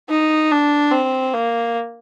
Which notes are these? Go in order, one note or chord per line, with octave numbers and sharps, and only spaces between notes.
D#4
D4
C4
A#3